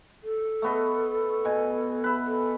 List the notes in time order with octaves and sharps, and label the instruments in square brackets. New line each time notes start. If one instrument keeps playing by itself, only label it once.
[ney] A4
[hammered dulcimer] A3 B3 D#5
B2 G#5
B4 E5
[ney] A4